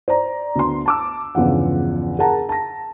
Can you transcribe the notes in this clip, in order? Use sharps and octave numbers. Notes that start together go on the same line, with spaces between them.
C5 D5 A#5
D2 B3 C6
A5 D6 E6
G1 E2 C#3 F3 F#5
G#4 A#4 F#5 A5 A#5
A5 A#6